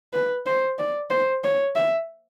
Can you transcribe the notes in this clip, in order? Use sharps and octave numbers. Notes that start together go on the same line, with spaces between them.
B4
C5
D5
C5
C#5
E5